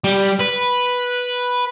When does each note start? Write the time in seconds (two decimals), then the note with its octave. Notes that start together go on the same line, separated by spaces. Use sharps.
0.04 G3
0.40 B4